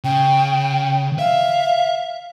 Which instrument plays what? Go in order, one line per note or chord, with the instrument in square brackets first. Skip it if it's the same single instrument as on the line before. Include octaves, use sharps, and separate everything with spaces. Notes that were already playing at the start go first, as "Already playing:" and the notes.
[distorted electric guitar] C#3 [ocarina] G5
[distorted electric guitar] E5 [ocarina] F5